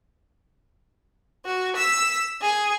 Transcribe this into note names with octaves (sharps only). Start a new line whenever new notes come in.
F#4
E6 B6
G#4